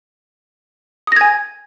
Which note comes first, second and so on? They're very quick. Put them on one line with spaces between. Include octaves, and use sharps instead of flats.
D#6 A#6 G#6 G#5